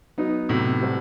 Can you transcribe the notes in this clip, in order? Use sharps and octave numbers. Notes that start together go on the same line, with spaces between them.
F#3 B3 D#4
A2 C3 F#3 B3 D#4
B2 G3 B3 F#4 C5